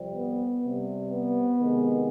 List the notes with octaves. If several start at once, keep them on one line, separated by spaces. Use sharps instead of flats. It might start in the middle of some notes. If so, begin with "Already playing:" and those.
Already playing: F2 C3 G3
B3
C3 G3
B3
C3 D#3 G#3